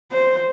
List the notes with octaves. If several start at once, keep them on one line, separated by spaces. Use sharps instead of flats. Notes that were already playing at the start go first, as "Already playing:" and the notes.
C5